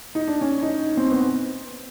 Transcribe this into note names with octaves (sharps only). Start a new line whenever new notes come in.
D#4
D4
C#4
D#4
C4
B3